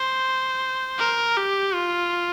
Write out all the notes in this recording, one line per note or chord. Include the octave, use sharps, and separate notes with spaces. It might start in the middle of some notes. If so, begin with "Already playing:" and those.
Already playing: C5
A#4
G4
F4